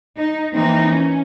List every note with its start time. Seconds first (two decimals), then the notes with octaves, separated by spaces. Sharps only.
0.15 D#4
0.52 E3 A#3 C4 D#4
0.86 C#4